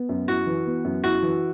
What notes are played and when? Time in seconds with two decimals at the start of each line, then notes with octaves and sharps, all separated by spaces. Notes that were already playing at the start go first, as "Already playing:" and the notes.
Already playing: B3
0.09 F#2
0.28 E4 F#4
0.47 E3
0.66 B3
0.85 F#2
1.04 E4 F#4
1.23 E3